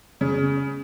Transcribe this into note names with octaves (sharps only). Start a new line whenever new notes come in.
C#3